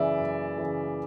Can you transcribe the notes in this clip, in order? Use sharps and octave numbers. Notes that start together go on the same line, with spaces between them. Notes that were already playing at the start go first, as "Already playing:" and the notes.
Already playing: F#2 C#3 E3 D5 E5
F#2
C#3 E3